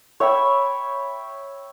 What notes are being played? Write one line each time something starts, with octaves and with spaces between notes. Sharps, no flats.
C#5 E5 G5 B5